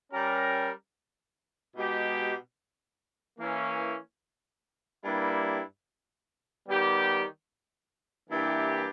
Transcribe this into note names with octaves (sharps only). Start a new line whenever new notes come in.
G3 C#4 G4 A#4
B2 G#3 D#4 G4
E3 A#3 C#4
G2 G3 A#3 E4
D#3 G3 B3 G4
G2 E3 A#3 E4 G4